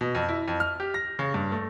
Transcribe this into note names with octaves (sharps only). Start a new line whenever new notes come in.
B2
F2
E4
F2
F6
G4
A#6
C#3
G2
A3